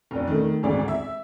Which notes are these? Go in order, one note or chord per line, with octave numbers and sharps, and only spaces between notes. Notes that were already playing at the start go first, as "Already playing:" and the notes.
F1 D4
D#3 A3
G#1 D2 G#2 D5
E5